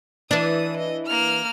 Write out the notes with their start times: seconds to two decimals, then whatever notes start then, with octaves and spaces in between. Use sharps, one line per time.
0.31 E3 D4 D#6
0.77 D#5
1.07 A#3 F6